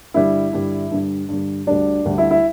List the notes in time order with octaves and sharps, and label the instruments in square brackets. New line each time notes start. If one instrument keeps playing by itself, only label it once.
[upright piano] G2 D3 G3 E4
G2 D3 G3
G2 D3 G3
G2 D3 G3
D2 D3 G3 D4
D2 D3 G3
E4
E4